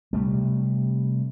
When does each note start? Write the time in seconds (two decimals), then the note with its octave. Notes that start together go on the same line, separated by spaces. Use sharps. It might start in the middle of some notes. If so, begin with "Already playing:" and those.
0.13 C3 G3 A3